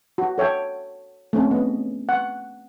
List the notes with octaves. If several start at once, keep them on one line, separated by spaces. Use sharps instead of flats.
F#4
A4 C#5 E5 G5
A3 C4 C#4
B3 D#5
F#5